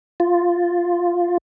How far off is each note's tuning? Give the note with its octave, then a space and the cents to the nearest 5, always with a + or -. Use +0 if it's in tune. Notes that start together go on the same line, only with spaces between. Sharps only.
F4 +0